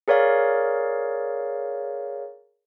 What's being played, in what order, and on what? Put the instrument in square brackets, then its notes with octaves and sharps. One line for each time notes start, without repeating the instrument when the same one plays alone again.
[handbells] G#4 A#4 C#5 D5 F5